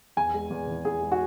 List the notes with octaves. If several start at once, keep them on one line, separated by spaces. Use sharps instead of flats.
E2 G#5
G#3
E2
E3
E2 G#4
G#3
F#4